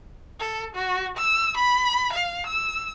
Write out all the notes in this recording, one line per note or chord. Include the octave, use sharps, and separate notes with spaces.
A4
F#4
E6
B5
F5
E6